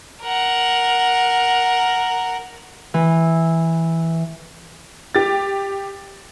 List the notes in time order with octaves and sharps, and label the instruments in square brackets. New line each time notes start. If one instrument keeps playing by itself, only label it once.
[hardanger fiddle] A#4 F#5
[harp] E3
[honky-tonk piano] G4 A6